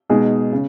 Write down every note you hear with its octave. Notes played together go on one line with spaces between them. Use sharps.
B2 G#3 D#4 G#4
C#3